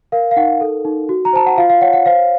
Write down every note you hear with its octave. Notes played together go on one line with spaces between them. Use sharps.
A#4 F5
F5
D#4 F#5
A4
D#4
F#4
A#5
C5 A5
F#5
F4 F5
F5
C#5 F#5
F#5
C5 F5